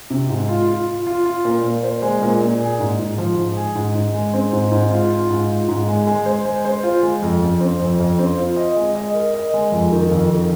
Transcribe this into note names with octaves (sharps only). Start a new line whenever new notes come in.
C3
G#2
F4
F4
F4
F4
F4
A#2
A#2
C5
G#3
A#2
A#2
G#4
G#2
G#2
F3
G#2
G#4
G#2
G#2
G#3
C4
G#2
G#2
F4
F4
G#2
F4
G#2
G#3
G#3
C5
G#3
C5
F4
G#3
F2
F2
C4
F2
F2
C4
F4
D#5
G#3
D#5
A#4
D#5
G#3
F2
D#3
F2
D#3